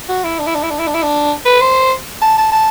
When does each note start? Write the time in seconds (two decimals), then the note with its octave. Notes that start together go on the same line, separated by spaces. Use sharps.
0.09 F#4
0.24 E4
0.39 D4
0.47 E4
0.55 D4
0.63 E4
0.71 D4
0.79 E4
0.87 D4
0.94 E4
1.03 D4
1.45 B4
1.61 C5
2.21 A5
2.38 A5
2.52 A5